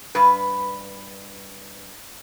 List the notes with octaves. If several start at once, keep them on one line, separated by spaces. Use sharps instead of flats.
G2 B4